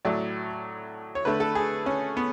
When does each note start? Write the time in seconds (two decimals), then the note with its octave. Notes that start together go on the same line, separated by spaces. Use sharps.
0.05 A2 F#3 A3 D5
1.15 C#5
1.25 D3 A3 B4
1.40 A4
1.55 G#4
1.86 C#4
2.17 B3